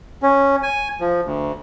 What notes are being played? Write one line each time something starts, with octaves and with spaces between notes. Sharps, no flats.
C#4
G#5
F3
D2